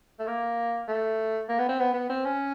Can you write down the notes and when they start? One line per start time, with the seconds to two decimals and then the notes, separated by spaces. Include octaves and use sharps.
0.19 A3
0.27 A#3
0.88 A3
1.49 A#3
1.59 B3
1.69 C4
1.80 B3
1.94 B3
2.10 C4
2.25 C#4